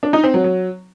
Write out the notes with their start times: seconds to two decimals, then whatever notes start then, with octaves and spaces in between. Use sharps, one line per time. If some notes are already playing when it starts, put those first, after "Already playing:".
0.03 D4
0.13 D#4
0.24 C4
0.34 F#3
0.44 F#3